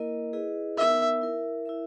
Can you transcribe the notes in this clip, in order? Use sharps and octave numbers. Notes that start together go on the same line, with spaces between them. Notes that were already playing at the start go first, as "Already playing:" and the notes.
Already playing: A#3 E4 A#4 D#5
E4 G#4 B4 D#5
B3 D#4 A#4 E5
E4 A#4 E5
E4 A#4 E5